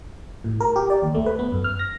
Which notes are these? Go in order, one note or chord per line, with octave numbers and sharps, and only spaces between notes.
A2
A#4
G4
D5
D#2
A3
B4
B3
F#2
F6
A#6